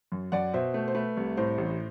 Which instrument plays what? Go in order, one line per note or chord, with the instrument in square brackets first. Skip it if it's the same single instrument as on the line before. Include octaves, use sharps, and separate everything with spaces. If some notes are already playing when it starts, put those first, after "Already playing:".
[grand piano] F#2
F#2 D5 F#5
B2 C5 E5
A3
C5
A3 B4
C2
A2 C5
A1